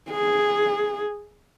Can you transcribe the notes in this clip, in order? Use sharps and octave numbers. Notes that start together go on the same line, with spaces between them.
G#4